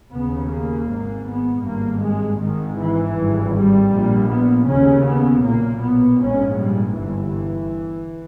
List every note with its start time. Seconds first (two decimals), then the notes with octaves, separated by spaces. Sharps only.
0.12 D#2 C#3 B3
0.51 A#3
0.89 G#1 G#2
1.27 B3
1.64 G#1 G2 A#3
2.03 G#3
2.41 G#1 G#2 D#3
2.79 E3
3.17 G#1 G2
3.54 G3
3.92 A#1 A#2
4.31 B3
4.68 D#2 C#3 C#4
5.06 B3
5.44 B1 A#2 A#3
5.83 B3
6.21 A#1 G#2 C#4
6.59 G3
6.96 G1 G2 E3